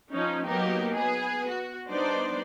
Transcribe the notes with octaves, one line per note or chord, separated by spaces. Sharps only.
F3 C#4 D#4
F#3 A#3 B3 D#4 G4 A#4
B3 G#4 B4
F#4
G3 B3 D4 D#4 C5 D5